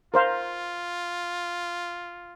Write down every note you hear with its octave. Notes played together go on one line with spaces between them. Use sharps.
F4 A#4 C5 F5